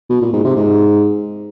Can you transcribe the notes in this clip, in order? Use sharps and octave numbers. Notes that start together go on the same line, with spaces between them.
B2
A#2
G#2
C3
G#2